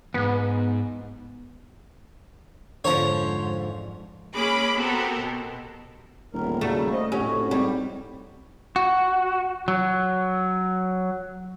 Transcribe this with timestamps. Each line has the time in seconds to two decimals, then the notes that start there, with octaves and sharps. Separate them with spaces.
0.14 E2 G#2 B3
2.85 F2 G#2 D3 F3 C5 C#5 A#5
4.35 G#3 A#3 C#4 G#4 B5 D6
4.76 B3 C4 F#4 G4 A4 A#4
5.21 B2
6.33 D#1 E2 A2 A#4
6.61 C#3 F#3 G3 A3
6.92 C5 D#5 E5
7.12 F1 A2 C#4 F#4 G4
7.51 G#2 G3 C4
8.76 F#4
9.68 F#3